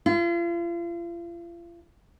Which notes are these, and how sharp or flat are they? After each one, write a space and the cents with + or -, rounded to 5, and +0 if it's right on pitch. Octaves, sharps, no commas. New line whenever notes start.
F4 -40